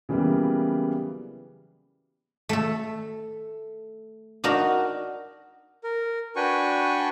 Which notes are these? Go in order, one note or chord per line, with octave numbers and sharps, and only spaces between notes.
C#3 E3 F#3 G3 A#3 B3
A3 A4
D4 D#4 F#4 A#4
A#4
D4 F#4 B4 G5 G#5 C#6